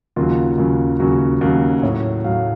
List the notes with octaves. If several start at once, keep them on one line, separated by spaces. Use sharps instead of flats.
D#2 C#3 F#3 F4
D#2 C#3 F#3
D#2 C#3 F#3 F#4
D#2 C#3 F#3
A2 F#3 C#5
A2 F#3 F5